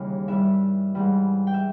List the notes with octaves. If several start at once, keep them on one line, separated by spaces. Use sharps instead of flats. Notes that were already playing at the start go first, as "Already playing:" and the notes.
Already playing: D#2 C#3 E3 G3 G#4 G#5
G2 G3 E4 E5
G#2 E3 G3
G5
E5